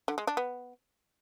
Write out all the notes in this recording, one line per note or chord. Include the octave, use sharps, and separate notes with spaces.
D3
G#3
D4
B3